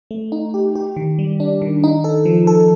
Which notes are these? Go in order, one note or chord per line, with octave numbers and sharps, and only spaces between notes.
A3
D#4
G4
G4
D#3
G3
D4
D#3
D#4
A4
F3
A4